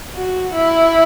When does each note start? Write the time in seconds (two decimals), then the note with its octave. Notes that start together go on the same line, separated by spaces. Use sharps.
0.15 F#4
0.54 E4